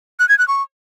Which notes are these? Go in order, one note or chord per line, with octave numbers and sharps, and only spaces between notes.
F#6
G#6
F#6
C#6